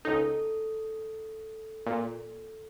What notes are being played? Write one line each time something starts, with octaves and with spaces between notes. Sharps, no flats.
C#2 D#4 A4
A#2